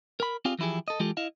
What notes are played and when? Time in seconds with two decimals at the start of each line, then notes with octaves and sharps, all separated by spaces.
0.20 A#4 B5
0.45 C4 F4 G4 G#4 D5 F5
0.59 E3 F3 E4 G4 G#4
0.88 A4 D#5
1.00 E3 G#3 F4 G4 A4
1.17 E4 D#5 F5